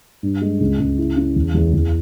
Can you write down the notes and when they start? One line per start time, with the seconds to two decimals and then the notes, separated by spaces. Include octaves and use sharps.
0.23 G2
0.42 G#3
0.60 C#2
0.80 C#2
0.98 E4
1.17 C#4
1.36 E2
1.54 E2
1.73 E2